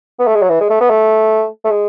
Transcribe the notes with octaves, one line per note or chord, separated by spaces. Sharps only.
B3
A3
G#3
F#3
E3
G#3
A3
B3
A3
A3
G#3